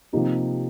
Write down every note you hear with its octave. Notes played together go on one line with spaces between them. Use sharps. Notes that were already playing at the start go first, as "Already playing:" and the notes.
C3 F3 A#3 D#4 G4